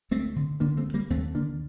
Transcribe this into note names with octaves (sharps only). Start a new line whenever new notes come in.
D2 A3 C4
D3
D3 A#3 D4
A3 C4
D2
G3 A#3
D#2 A3 C4
D3 A#3 D4